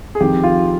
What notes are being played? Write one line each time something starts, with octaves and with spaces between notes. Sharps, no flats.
G#4
F2 D#3 G4
F4